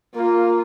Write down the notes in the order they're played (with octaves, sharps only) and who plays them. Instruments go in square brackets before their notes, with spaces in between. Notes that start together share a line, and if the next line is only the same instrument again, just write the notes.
[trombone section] A#3 [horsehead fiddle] F4